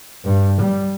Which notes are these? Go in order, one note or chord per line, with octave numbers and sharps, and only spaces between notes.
G2
G3